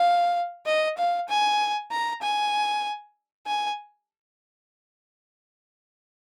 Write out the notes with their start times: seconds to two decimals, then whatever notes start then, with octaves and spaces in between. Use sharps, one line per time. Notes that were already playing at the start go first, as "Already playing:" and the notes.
Already playing: F5
0.66 D#5
0.98 F5
1.29 G#5
1.91 A#5
2.22 G#5
3.47 G#5